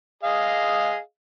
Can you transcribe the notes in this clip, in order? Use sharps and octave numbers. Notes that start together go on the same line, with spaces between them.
G#4 D#5 F5